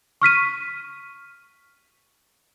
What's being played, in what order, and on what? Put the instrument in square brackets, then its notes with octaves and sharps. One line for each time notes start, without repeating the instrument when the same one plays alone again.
[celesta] C#6 F6 B6 D#7